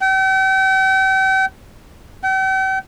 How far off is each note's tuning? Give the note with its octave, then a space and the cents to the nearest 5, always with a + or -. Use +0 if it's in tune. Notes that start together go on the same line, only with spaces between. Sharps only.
G5 -40
G5 -45